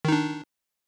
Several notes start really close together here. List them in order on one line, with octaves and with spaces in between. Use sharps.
D#3 D#4 D4